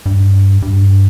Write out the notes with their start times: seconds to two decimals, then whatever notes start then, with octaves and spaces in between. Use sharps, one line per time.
0.06 G2
0.62 G2